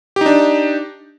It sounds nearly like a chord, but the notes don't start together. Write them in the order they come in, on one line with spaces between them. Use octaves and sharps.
G4 D#4 D4